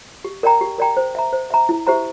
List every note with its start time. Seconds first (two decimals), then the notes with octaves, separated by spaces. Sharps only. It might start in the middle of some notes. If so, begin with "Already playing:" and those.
0.25 G4
0.43 A#4 D5 G5 A#5
0.61 G4
0.79 A#4 D5 G5 A#5
0.97 C5
1.15 E5 A#5
1.33 C5
1.50 E5 A#5
1.69 E4
1.87 G4 C5 E5 A#5